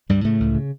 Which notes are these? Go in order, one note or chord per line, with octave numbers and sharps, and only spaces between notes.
C#2 G2 G3
A2 C#3 A3
C#2
C#3